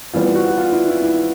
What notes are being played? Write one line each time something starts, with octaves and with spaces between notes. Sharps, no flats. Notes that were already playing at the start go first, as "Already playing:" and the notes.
E3 G3 B3 F4
F#4
F4
E4
E4
E4